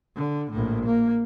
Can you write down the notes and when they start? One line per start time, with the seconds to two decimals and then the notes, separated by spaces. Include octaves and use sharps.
0.16 D3
0.51 A#1 A2
0.86 A#3